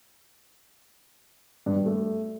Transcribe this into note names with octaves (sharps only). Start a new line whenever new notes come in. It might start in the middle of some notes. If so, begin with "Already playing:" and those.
G2
G3
A3